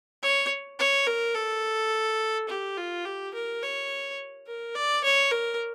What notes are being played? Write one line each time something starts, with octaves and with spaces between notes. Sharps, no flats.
C#5
C#5
A#4
A4
G4
F4
G4
A#4
C#5
A#4
D5
C#5
A#4